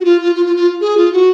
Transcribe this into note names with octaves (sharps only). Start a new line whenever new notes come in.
F#4
F4
F4
F4
F4
F4
G#4
F4
F#4